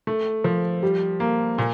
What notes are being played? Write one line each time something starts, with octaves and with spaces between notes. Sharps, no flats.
A3
F3
G3
A#3
A#2